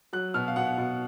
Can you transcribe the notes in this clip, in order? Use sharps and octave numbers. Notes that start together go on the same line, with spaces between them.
F#3 F#6
B2 F6
F5
B2 F#5
B2